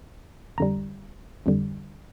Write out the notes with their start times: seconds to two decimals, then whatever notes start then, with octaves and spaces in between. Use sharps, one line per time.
0.58 G1 F2 D3 G3 A#5
1.46 G1 F2 D3 G3